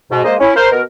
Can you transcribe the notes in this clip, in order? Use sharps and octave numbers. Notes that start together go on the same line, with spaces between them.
G#2 B2
G#3 A#3 C5 D#5
C#4 E4
A#4 C5
B2 A#4